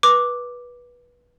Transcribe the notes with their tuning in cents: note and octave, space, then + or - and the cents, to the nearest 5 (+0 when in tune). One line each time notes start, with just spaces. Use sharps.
B4 -20 D6 +0